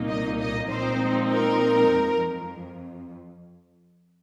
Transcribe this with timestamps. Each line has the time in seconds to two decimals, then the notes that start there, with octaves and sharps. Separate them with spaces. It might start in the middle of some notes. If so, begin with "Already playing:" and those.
Already playing: C2 A#2 A#3 D#4
0.09 D#5
0.39 D#5
0.69 A#2 F3 G#3 C4 D#4 C5
1.31 A#4
1.92 F2